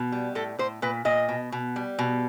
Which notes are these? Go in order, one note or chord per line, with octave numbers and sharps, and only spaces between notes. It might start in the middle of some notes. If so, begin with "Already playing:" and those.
Already playing: B2
G3
A2 A4
A2 C5
A#2 B4
A#2 D#5
B2
B2
G3
B2